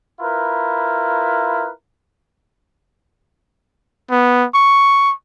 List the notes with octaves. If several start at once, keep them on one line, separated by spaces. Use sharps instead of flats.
E4 F4 A#4 B4
B3
C#6